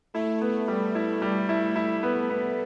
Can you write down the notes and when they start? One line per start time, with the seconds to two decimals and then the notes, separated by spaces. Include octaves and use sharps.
0.14 A3 E4
0.41 B3
0.68 G3
0.95 E4
1.22 G3
1.49 E4
1.76 A3 E4
2.03 B3
2.30 B3